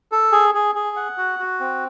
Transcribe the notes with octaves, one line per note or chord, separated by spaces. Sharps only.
A4
G#4
G#4
G#4
F#5
F#4
F#4
C4